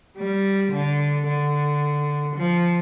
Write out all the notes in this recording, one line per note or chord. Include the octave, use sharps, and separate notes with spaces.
G3
D3
D3
F3